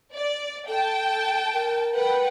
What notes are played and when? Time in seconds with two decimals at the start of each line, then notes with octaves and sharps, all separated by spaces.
0.14 D5
0.68 A4 G5 A5
1.54 A#4
1.94 B4 F#5 G5